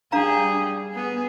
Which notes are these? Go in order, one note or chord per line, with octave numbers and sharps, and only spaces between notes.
G3 D4 G#4 F5 A#5
B3 G#4